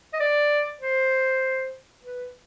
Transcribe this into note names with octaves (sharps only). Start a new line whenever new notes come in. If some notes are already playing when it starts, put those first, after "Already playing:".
D#5
D5
C5
B4